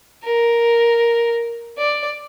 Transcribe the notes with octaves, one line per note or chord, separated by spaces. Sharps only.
A#4
D5